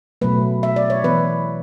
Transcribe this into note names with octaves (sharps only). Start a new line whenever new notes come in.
B2 F#3 A3 B4
E5
D5
C#5
E3 B3 B4